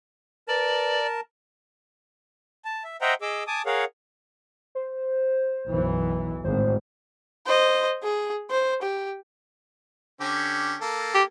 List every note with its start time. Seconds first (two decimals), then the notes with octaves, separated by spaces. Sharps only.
0.48 A#4 B4 D5 A5
2.65 A5
2.84 E5
3.02 C5 D#5 E5 F#5 G5 A#5
3.22 G#4 D#5 D6 E6
3.47 G#5 A5 D6 D#6
3.66 G#4 A#4 C#5 F5 F#5
4.75 C5
5.67 B1 F#2 E3
6.44 G#1 A2 C5
7.46 C5 D#5
8.03 G#4
8.51 C5
8.82 G4
10.21 D3 C#4 G4
10.81 A#3 A4
11.14 G4